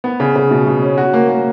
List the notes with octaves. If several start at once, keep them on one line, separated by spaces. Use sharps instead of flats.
B3
C#3
C#3
B2
B2
C#4
F#4
A#3
A#3